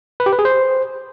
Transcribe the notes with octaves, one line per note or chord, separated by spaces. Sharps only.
B4
G4
B4
G#4
C5